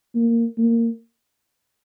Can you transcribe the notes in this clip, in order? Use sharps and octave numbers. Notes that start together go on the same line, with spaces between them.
A#3
A#3